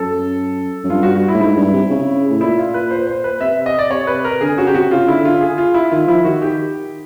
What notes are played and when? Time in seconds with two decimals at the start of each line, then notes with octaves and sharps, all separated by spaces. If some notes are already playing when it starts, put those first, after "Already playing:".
Already playing: F#2 A4
0.84 F#2
0.90 G2 F4
1.03 F#4
1.15 F#4
1.28 E4
1.33 A2
1.41 G#2 E4
1.57 G2
1.74 C3
1.90 C#3
2.30 A2
2.41 A#2 E4
2.58 F4
2.74 B4
2.91 C5
3.07 C5
3.24 B4
3.41 C3 E5
3.66 D#5
3.79 D5
3.91 C3 C#5
4.07 B4
4.25 A#4
4.41 D3 G#4
4.57 C#3 F#4
4.67 G4
4.74 C3 F#4
4.91 C#3 F4
5.08 D3 E4
5.24 D3 F4
5.41 G#4
5.58 F4
5.74 E4
5.91 D#3 F4
6.07 F3 E4
6.24 D#3 F#4
6.42 G4